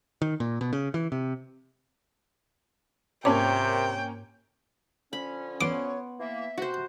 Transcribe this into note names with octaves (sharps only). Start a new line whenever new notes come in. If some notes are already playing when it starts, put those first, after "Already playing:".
D#3
A#2
B2
C#3
E3
C3
G#2 C3 A#3 C#4 C#5 G5 D6
D3 F3 C#4 B5
B3 C#5 C6 D6
E3 A#3 E5
C3 F#4 C5